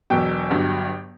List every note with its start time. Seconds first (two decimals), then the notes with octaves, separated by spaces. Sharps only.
0.10 E1 E2 B2 F#3 G5
0.51 G1 G2 F#3